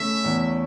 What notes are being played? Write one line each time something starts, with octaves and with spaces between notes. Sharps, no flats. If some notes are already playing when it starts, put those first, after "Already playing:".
Already playing: C#3 A3 C#4 E5
E2